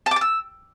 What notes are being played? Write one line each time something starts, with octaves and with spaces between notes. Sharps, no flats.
A5
D6
A5
E6